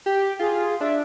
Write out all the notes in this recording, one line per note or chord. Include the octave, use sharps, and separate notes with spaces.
G4
F4 G#4
D4 E5